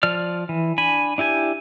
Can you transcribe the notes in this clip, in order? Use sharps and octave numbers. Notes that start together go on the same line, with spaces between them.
F3 D5 F6
E3
D4 G#5 B5
D4 E4 G4 G#5